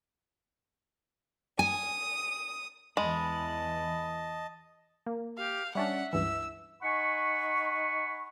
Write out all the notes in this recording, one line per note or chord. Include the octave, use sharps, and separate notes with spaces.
G#5 D#6
E2 E3 G#3 D#5 A5 B5
A#3
G4 F5
G3 C#4 D4 E5 F#5
C#2 G2 E3 E6
D#4 F#5 G#5 B5 C#6